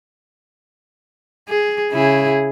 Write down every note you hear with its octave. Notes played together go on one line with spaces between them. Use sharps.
G#4
C#3 E4 G#4